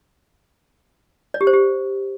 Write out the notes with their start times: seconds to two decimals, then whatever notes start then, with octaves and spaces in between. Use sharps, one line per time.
1.34 D5
1.41 G4
1.47 C5
1.53 G4